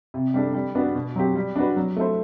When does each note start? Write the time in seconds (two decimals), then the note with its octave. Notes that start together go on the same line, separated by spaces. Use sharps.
0.14 C3
0.34 G3 D4 A4
0.54 G3
0.75 B3 D4 F#4
0.95 B2
1.16 F#3 C4 G4
1.35 G3
1.56 D4 F#4 B4
1.77 F#3
1.97 A3 E4 A4 C5